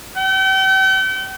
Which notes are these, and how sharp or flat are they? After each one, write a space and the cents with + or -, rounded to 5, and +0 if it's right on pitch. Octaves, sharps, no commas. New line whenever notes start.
G5 -40